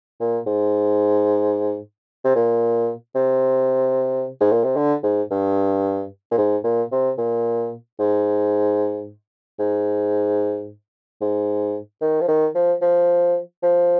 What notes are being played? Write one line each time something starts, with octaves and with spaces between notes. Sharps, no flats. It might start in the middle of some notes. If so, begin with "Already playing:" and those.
A#2
G#2
C3
A#2
C3
G#2
A#2
C3
D3
G#2
G2
A#2
G#2
A#2
C3
A#2
G#2
G#2
G#2
D#3
F3
D#3
F3
F3
F3